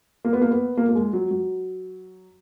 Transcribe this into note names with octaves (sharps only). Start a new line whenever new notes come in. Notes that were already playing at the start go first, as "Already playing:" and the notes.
A#3
B3
A#3
B3
A#3
A#3
G#3
F#3
F#3